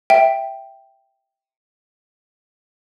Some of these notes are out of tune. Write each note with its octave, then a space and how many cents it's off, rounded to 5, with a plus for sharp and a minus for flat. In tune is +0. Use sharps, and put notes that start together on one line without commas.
E5 +0 G5 +0